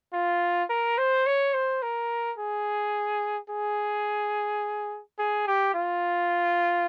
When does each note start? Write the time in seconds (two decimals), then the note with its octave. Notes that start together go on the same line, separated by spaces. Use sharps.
0.13 F4
0.70 A#4
0.98 C5
1.27 C#5
1.54 C5
1.82 A#4
2.38 G#4
3.50 G#4
5.19 G#4
5.47 G4
5.74 F4